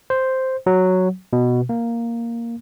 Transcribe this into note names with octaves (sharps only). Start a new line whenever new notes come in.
C5
F#3
B2
A#3